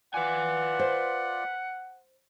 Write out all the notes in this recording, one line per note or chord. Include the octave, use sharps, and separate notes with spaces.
F4 B4 D5 F#5 G#5
C5